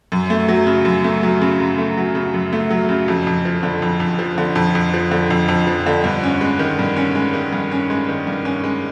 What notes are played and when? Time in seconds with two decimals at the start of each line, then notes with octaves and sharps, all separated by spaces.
0.12 F#2
0.30 A3
0.49 F#3
0.67 C#3
0.85 F#2
1.04 A3
1.23 F#3
1.41 C#3
1.60 F#2
1.78 A3
1.97 F#3
2.15 C#3
2.34 F#2
2.53 A3
2.70 F#3
2.89 C#3
3.08 F2
3.27 F2
3.45 F3
3.63 D3
3.82 F2
4.00 F2
4.19 F3
4.38 D3
4.55 F2
4.75 F2
4.94 F3
5.11 D3
5.30 F2
5.48 F2
5.67 F3
5.86 D3
6.04 G2
6.23 C#4
6.41 G#3
6.59 D#3
6.79 G2
6.96 C#4
7.15 G#3
7.34 D#3
7.53 G2
7.71 C#4
7.90 G#3
8.09 D#3
8.27 G2
8.45 C#4
8.64 G#3